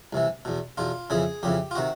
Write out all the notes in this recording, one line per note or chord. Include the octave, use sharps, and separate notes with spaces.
C2 C3 E3
E2 B2
E2 B2 F4
F2 C#3 E3 G#4
F2 C#3 E3 G4
F4
C3 D#3 F#4